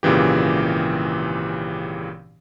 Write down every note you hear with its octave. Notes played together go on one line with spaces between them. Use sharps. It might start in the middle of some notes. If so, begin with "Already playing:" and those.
G#1 A#2 C#3 E3 G4